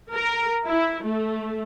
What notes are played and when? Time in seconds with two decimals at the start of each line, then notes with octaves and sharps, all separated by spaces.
0.13 A#4
0.66 E4
1.04 A3